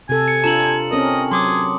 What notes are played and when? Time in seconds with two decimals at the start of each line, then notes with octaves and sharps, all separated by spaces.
0.09 C3 A4 G#5
0.28 C#7
0.44 D4 F4 A4 A5 A#5 F#7
0.91 C4 C#4 A#4 D#5
1.32 F#3 G#4 C6 D6 D#6